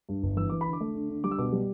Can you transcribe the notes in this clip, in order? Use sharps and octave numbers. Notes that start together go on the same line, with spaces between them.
G2
G1
E3 E6
E3 D6
B5
D3
D6
A3
D3
D3
G3 D6
E6
B2 D6
G3